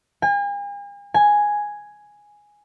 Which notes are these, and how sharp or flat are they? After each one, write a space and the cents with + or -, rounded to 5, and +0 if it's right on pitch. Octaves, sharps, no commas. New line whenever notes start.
G#5 -45
G#5 +0